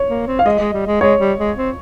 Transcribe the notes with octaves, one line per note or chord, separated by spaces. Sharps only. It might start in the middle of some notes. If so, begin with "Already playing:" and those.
Already playing: C#5
A#3
C4
F5
G#3 D#5
G#3
G3
G#3
G#3 C#5
G3
G#3
C4